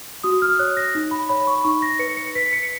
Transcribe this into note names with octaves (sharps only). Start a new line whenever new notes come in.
F#4 D#6
F6
C#5 F#6
A#6
D#4
B5
C#5 B5
C#6
D#4 C#6
A#6
B4 C#7
C#7
B4 B6
C#7